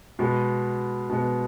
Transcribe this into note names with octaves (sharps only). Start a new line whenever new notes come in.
B2 G#3 B3
B2 G#3 B3